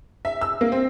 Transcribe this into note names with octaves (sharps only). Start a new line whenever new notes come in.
E5
E6
A#3
C4